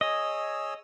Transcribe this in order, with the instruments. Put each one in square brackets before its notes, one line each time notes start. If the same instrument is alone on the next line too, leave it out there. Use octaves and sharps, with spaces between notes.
[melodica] G#4 C#5 E6 [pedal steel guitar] D#5